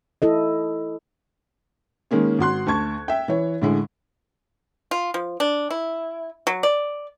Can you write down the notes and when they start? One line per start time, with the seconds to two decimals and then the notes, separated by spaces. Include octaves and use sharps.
0.22 E4 A4 D#5
2.11 D#3 G#3 A#3 C#4
2.39 G#1 F#4 C6 F#6
2.67 D2 A5 C#6 G#6
3.08 E5 G5
3.28 E3 C#5
3.62 A2 D3 G#3
4.91 F4
5.14 F3
5.40 D4
5.70 E4
6.47 F#3
6.63 D5